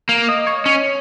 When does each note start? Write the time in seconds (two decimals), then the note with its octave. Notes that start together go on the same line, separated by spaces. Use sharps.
0.09 A#3
0.28 D#5
0.47 C#5
0.66 C#4